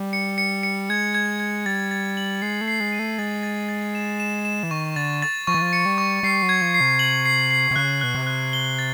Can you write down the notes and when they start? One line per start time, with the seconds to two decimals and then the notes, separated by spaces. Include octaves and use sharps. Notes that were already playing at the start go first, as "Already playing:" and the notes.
Already playing: G3
0.13 C#7
0.38 C#7
0.63 C#7
0.89 G#3 G#6
1.15 G#6
1.40 G#6
1.66 G3 A6
1.91 A6
2.17 F#7
2.42 G#3 C7
2.61 A3
2.68 C7
2.80 G#3
2.92 D#7
2.99 A3
3.19 G#3 A6
3.43 A6
3.69 A6
3.95 E7
4.20 E7
4.45 E7
4.63 E3
4.71 D#3 C#6
4.96 D3 A6
5.22 A6
5.47 F3 C#6
5.54 E3
5.62 F3
5.73 C#7
5.86 G3
5.98 C#6
6.23 G3 C7
6.43 F#3
6.49 G#6
6.62 F3
6.74 C7
6.81 C3
6.99 F#7
7.26 C7
7.51 C7
7.71 C3
7.76 C#3 F#6
8.01 B2 F#6
8.15 C3
8.27 F#6
8.53 G7
8.79 A6